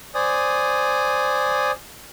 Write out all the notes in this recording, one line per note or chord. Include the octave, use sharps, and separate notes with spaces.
C5 D5 G#5 D#6